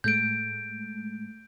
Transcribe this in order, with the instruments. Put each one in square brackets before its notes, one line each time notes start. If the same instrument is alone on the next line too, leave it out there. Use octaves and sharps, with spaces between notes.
[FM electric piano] A2 G#3 A3 [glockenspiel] G6 D7